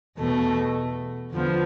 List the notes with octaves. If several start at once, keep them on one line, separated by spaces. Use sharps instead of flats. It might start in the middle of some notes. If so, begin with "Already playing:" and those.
E2 B2 A3
E2 D3 F3 B3